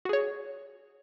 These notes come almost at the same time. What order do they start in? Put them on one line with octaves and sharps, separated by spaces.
F#4 G#4 C#5